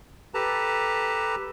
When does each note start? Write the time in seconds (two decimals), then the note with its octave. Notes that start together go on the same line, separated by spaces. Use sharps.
0.34 G4 A4 B4 A5 A#5